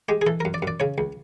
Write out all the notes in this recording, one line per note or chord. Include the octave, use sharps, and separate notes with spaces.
G#3 G4
G#4
E3 A4
F#2 A#4
D5
F#2
D5
C#3 C#5
C#2